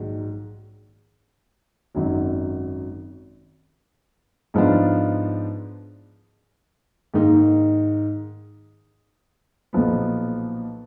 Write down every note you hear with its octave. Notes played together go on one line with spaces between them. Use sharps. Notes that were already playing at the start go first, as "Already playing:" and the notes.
Already playing: A#1 G#2 D#3 F#3
G#1 F#2 D#3 F#3
G#2 F3 B3 D4 F4
G#2 D#3 A#3 D#4
B1 A#2 F3 B3